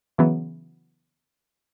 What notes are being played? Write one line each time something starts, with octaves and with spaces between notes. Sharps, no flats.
C#3 E3 F#3 B3